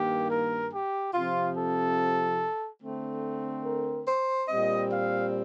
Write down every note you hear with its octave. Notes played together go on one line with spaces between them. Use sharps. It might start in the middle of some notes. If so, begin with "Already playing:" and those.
Already playing: G2 D#3 A#3 G4
A#4
G4
C3 F3 C4 F4
A4
D3 A3 C4
A#4
C5
A#2 G3 C4 D#5
F5